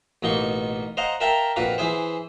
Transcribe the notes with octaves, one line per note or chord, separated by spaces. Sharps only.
A1 B2 A#3 D#4 C6 C#6
C5 D#5 F5 F#5 A#5
A#4 E5 F5 G5 A5 A#5
A#1 F2 F#4 B4 F5 D6
E3 E4 G#4 C5